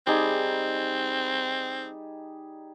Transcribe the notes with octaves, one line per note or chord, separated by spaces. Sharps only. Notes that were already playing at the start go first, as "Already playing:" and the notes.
G3 C4 D#4 G#4